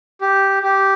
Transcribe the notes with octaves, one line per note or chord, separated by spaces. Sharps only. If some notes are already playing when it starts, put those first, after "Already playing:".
G4
G4